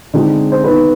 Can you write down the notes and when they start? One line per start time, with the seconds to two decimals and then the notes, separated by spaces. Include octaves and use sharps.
0.14 D3 G#3 C4 D#4
0.52 C5
0.63 D#3 B3 D#4 B4